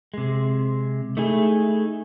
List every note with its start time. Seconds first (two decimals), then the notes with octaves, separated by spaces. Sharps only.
0.14 C3 G#3
1.17 A3 D#4 E4 G#4